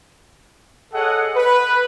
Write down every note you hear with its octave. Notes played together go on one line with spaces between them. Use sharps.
G#4 A4 C#5 D#5 F#5
B4